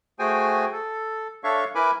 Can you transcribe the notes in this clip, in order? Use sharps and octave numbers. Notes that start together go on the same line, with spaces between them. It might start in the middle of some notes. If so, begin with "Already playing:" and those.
A3 F#4 G#4 C5 G5 G#5
A4
D4 A4 C#5 E5 F5 C#6
E4 A#4 B4 G#5 B5 D6